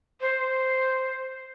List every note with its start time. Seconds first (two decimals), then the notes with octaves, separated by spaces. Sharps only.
0.21 C5